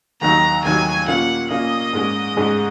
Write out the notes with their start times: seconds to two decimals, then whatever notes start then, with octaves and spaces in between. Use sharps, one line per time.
0.21 D#2 D#3 F#3 D#4 F#4 A#5
0.64 D#2 D#3 F#3 D#4 F#4 G#5
1.07 A#2 A#3 C#4 F#5
1.50 A#2 A#3 C#4 D#5
1.93 G#2 G#3 C#4 G#4
2.37 G#2 G#3 C#4 G#4